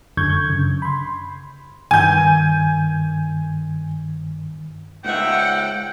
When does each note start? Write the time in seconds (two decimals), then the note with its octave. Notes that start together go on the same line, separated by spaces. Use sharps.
0.17 F#2 D3 C#6 G6 G#6
0.50 C#3
0.82 B5 C6
1.91 G2 D#3 G#5 G6
5.05 C#2 E5 F#5 G5